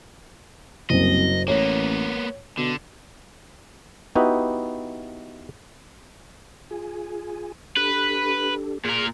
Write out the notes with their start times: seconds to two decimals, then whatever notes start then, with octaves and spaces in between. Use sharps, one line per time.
0.90 F#1 C2 F#2 D#5
1.48 A1 A#3 B3 C#5
2.58 B2 D3
4.15 B3 D#4 E4 F#4 G4 B4
6.71 F4 G#4 G#5
7.77 D4 G4 A4 B4
8.85 A#2 G#4 A#4